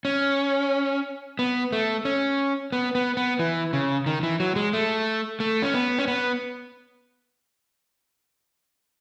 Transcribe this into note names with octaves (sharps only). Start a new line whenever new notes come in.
C#4
B3
A3
C#4
B3
B3
B3
E3
C#3
D#3
E3
F#3
G#3
A3
A3
C#4
B3
C#4
B3